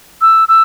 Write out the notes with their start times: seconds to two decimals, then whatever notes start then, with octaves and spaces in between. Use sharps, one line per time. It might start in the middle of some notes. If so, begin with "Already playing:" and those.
0.21 E6
0.48 E6